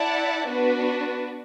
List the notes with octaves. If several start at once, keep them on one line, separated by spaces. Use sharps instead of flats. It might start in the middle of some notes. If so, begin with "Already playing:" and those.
Already playing: E4 D5 F#5 A5
B3 D4 F#4 B4